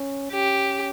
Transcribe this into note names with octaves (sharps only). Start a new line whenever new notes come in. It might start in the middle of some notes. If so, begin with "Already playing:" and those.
Already playing: C#4
C#4 G4